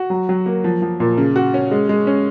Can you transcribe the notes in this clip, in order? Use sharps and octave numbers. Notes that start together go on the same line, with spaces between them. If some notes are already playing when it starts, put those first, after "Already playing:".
Already playing: F#4
F#3
F#3
A#3
F3
F3
A#2
C#3
F#4
C#4
G#3
G#3
C#4